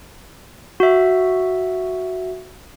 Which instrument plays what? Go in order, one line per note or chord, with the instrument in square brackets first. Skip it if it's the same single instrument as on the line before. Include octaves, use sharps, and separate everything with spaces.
[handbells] F#4 E5